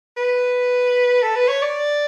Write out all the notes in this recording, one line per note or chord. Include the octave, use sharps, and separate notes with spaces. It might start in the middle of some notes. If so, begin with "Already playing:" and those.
B4
A4
B4
C#5
D5